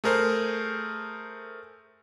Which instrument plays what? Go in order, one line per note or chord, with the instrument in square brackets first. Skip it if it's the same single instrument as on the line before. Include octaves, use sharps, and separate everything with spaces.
[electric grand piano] A3 G#4 A#4 C5